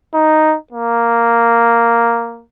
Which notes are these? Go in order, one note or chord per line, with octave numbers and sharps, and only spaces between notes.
D#4
A#3